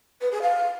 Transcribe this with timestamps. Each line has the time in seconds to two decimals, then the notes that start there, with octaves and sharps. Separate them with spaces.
0.21 B4
0.31 G#4
0.42 F5